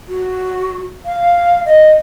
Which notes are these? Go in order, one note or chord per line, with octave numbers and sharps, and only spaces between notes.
F#4
F5
D#5